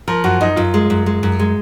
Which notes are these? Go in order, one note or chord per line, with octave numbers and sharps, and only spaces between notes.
F3 A#4
F#2 F#4
F#2 D#4
F#2 F4
G#3
F#2
G#3
F#2
G#3